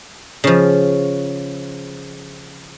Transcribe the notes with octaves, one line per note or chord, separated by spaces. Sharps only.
C#3 F3